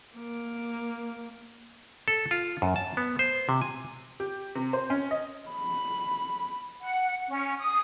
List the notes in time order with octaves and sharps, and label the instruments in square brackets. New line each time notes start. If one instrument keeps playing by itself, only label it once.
[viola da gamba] A#3
[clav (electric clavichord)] A4
F4
F#2
A5
B3
C5
C3
G#5
[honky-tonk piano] G4
C3
C5
C#4
D#5
[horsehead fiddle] B5
[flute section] F#5
C#4
D#6